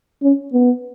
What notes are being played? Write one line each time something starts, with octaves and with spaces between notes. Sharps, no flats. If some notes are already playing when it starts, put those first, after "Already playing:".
C#4
B3